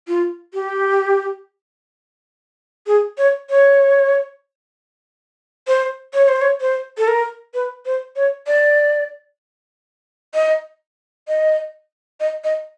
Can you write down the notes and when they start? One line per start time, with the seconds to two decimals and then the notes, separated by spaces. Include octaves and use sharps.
0.08 F4
0.54 G4
2.87 G#4
3.18 C#5
3.50 C#5
5.68 C5
6.14 C#5
6.28 C5
6.41 C#5
6.61 C5
6.98 A4
7.08 A#4
7.54 B4
7.86 C5
8.16 C#5
8.47 D5
10.34 D#5
11.28 D#5
12.20 D#5
12.44 D#5